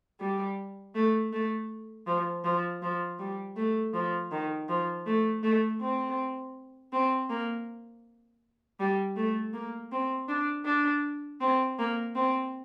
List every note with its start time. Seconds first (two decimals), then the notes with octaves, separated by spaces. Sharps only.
0.20 G3
0.95 A3
1.33 A3
2.06 F3
2.44 F3
2.82 F3
3.19 G3
3.56 A3
3.94 F3
4.31 D#3
4.69 F3
5.06 A3
5.43 A3
5.81 C4
6.92 C4
7.29 A#3
8.79 G3
9.16 A3
9.53 A#3
9.91 C4
10.28 D4
10.65 D4
11.40 C4
11.79 A#3
12.15 C4